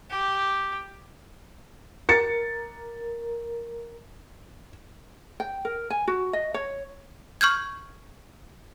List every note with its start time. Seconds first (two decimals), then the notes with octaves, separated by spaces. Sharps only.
0.11 G4
2.09 A#4 A6 C#7
5.40 G5
5.65 A#4
5.90 G#5
6.08 F#4
6.33 D#5
6.54 C#5
7.41 C#6 F6 G6 G#6